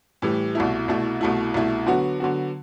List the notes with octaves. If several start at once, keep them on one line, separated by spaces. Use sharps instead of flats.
A2 E3 G3
C2 B2 A3 E4
C2 B2 A3 E4
C2 B2 A3 E4
C2 B2 A3 E4
D3 F#3 B3 F#4
D3 F#3 B3 F#4